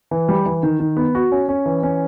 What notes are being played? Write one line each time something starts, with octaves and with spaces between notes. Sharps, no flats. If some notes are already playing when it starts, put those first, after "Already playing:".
E3
G3
E3
D#3
D#3
B3
F#4
C#4
C#4
E3
C#4